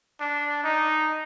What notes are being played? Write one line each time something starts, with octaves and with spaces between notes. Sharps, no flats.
D4
D#4